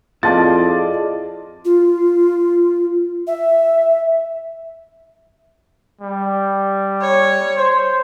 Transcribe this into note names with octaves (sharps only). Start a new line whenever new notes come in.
F2 E4 F4 G#4 D5 D#5 A5 A6
F4
E5
G3
C#5
C5